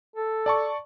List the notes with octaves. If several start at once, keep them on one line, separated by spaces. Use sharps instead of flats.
A4
D5 A5 C#6